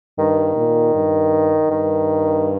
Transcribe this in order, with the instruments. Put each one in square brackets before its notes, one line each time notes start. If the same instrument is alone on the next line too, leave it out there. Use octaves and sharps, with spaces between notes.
[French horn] G2 [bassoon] D#3
[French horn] A#2
G2
[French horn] G2 [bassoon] D#3